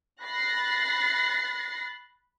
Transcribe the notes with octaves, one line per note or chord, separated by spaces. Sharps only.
B5 F#6 A6 A#6 C7